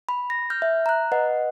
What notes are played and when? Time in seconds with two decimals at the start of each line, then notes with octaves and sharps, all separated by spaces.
0.09 B5
0.30 A#6
0.50 F6 G6
0.62 E5
0.86 A#5 F#6
1.12 B4 D#5 F#5